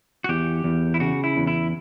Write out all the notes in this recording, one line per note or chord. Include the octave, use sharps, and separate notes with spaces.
F#4
E2 G4
E2
E4
C#3 F#4
E4
E2
E4